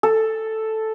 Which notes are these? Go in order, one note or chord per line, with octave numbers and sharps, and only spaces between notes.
A4